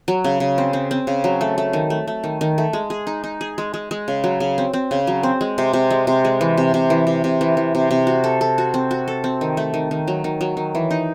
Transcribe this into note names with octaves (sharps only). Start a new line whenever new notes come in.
F#3
C#3
C#3
C4
C4
C4
C#3
F#3
A3
A3
D#3
A3
A3
D#3
D#3
A3
G#3
G#4
D#4
D#4
G#4
G#3
G#3
G#3
C#3
F#3
C#3
C4
C4
C#3
F#3
C4
G#3
C3
C3
G#3
C3
G#3
E3
C3
C3
E3
C3
C3
E3
E3
C3
C3
F#4
A4
A4
F#4
C4
F#4
A4
C4
D#3
A3
D#3
D#3
F#3
D#3
F#3
D#3
E3
D#4